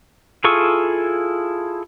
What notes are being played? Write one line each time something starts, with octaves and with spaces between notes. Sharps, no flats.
E4 F4 G#4 A4 C#6